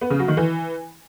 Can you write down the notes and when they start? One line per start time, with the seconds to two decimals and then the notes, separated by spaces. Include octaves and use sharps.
0.01 B3
0.10 C#3
0.19 F#3
0.28 D#3
0.37 E3